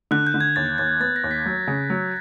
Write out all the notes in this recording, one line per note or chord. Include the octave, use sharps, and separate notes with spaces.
D3 F#6
G6
D3
G#6
D#2 A6
D#2 A6
B3 A6
A#6
D#2
B6
F#3
C#3
F#3